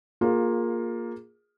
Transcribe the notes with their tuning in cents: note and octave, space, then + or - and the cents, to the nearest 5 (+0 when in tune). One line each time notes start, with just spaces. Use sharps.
A#3 +0 F4 +20 G#4 +0